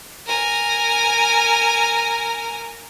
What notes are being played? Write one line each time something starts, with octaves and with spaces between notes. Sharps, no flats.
A#4 G#5